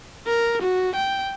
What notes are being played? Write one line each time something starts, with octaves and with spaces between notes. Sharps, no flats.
A#4
F#4
G5